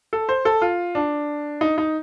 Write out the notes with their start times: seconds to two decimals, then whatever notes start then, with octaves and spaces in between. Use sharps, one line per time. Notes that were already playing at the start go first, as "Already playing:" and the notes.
0.13 A4
0.29 C5
0.45 A4
0.62 F4
0.95 D4
1.61 D#4
1.78 D#4